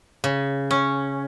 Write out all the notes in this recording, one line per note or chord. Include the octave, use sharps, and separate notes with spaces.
C#3
C#4